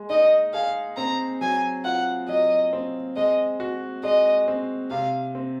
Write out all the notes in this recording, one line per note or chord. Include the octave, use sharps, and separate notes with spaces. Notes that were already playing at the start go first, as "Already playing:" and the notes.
Already playing: G#3
D#4 D#5
G#4 F5
C4 A#5
F#3 G#5
F4 F#5
F#3 D#5
C4
G#3 D#5
F#4
G#3 D#5
C4
C3 F5
C4